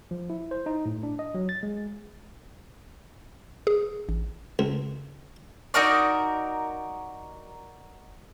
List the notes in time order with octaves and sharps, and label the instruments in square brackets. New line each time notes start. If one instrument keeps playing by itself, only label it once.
[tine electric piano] F3
E4
C5
D#4
A2
D4
D#5
F#3
A6
G#3
[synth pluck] G#4
A1
[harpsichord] C#2
[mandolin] D#4 F#4 A#4 D5